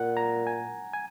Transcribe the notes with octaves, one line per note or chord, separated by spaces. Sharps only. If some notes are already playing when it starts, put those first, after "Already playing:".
Already playing: A#2 F#5
A#5
G#5
G#5